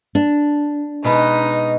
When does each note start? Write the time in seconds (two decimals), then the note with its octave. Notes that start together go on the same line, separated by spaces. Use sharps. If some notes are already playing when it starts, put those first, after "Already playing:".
0.15 D4
1.04 B2 G#3 D#4 B4